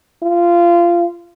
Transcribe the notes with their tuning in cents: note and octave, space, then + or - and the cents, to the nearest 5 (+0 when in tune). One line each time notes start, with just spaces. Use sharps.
F4 -20